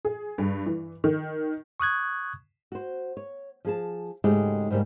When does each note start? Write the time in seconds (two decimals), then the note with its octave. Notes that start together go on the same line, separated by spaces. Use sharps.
0.05 G#4
0.38 G2
0.66 E3
1.04 D#3
1.80 C#6 D#6 F#6 G#6
2.72 F#4 C5
3.17 C#5
3.65 F3 G#4 A5
4.24 G#2 C#3 G#3 A3 F#4 G4
4.71 G#2 C#3 F3 G3 A#3